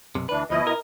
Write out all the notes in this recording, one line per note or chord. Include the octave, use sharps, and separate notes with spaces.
B1 F#2 C3
D2 E3 D4 B4
D2 B2 F3 E4 D#5
A#4